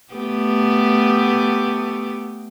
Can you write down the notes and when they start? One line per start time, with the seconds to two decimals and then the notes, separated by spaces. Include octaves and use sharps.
0.13 A3 B3 G4